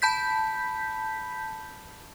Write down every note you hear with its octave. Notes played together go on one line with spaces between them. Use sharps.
A5 B5 G6 B6